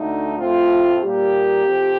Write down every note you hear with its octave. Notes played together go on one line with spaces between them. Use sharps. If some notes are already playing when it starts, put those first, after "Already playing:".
Already playing: D2 D3 A3 D#4
A2 A3 C4 F4
A#2 G3 A#3 G4
F2 C3 F3